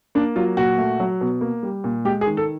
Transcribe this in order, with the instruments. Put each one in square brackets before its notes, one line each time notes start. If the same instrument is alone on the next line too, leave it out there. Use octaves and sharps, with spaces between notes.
[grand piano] A#3 D4
F#3 F4
A#2 F#4
A3
F#3
B2
A#3
G3
A#2
G#3 G4
G#4
D#3
A4